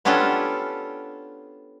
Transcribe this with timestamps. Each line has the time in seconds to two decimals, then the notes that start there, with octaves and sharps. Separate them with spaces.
0.05 B3 C#4 D4 F4 G4 A4